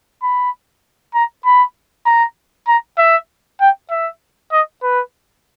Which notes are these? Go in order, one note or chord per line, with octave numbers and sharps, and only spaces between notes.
B5
A#5
B5
A#5
A#5
E5
G5
E5
D#5
B4